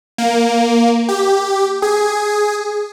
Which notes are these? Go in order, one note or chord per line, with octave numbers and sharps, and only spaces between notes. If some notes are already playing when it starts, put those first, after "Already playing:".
A#3
G4
G#4